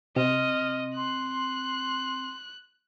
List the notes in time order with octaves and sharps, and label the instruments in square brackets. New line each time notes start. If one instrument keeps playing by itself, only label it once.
[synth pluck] C3 [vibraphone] C4 [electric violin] D#5 [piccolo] F6
[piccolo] C6 [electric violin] F#6